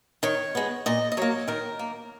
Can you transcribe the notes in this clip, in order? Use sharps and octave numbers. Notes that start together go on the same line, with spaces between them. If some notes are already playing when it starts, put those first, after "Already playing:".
D#3 C#5
G#3 B3
A#2 D#5
D#5
F#3 A#3 C#5
D#3 A#4
A#3